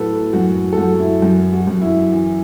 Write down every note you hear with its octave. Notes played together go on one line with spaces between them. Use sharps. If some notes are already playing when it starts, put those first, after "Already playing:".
Already playing: A2 F#3 F#4 A4 B4
F#2 F#4
A4
F#2 F#4
E4
F#2
F#4
F#2
E4
E3